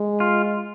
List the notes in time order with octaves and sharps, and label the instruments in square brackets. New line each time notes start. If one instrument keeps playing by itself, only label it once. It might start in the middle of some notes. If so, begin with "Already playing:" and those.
Already playing: [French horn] G#3
[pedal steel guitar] F4